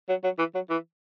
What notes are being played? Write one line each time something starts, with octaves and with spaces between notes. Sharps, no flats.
F#3
F#3
E3
F#3
E3